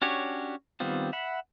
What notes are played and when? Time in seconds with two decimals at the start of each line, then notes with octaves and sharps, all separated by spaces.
0.02 C#4 D4 F#4 G4 C#5
0.80 D#3 G3 B3 C4 F4
1.13 E5 F#5 B5